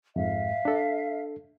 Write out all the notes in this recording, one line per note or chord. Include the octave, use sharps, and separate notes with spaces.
F2 G#2 E5 F5
D4 A4